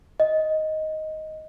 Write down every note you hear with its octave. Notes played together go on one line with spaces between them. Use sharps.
D#5